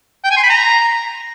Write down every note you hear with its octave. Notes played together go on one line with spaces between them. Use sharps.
G5
G#5
C6
B5
A#5